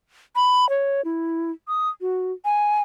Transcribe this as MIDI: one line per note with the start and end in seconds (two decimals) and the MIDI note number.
0.36 0.68 83
0.70 1.04 73
1.05 1.52 64
1.68 1.89 87
2.01 2.32 66
2.45 2.83 80